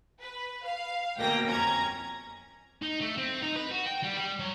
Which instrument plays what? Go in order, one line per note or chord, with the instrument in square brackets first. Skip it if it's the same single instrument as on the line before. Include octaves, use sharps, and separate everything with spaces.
[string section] B4
F5
D2 B2 A#3 G5 A#6
F2 C#4 A#5 G#6
[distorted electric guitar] D#4
A3
C4
D#4
B4
F#4
G5
G3
G3
F#3